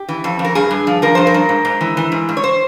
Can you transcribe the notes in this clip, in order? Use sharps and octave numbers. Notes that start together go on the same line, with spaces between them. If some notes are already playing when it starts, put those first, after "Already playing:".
Already playing: G4
E3
F2
F2
A#4
G2 G#4
G2
F3
F3 A#4
G2 C5
A#4
G2
G#2
G#2
E3
E3
G#2
G#2
C#5
C5